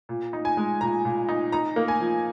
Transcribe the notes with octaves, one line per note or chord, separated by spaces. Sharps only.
A#2
D#4
G#5
G#3
A#2 A#5
A#2
D#4
D#4 A#5
A#3
G#5
F3